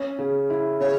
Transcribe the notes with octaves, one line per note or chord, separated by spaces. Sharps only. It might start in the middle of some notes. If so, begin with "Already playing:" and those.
Already playing: C#4
C#3
E4
C#3 C#5